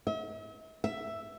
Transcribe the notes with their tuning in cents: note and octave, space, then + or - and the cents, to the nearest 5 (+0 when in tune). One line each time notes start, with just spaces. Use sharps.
E5 -45
E5 +5